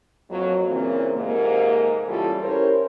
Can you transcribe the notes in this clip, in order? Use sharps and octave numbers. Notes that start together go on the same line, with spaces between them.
F2 F#3 A#3
A#2 C#3 E3 A#3 C4
F2 G#2 C3 A#3
C#3 E3 G3 F4 F#4 A4
C#4 E4 G4 A#4 C5 C#5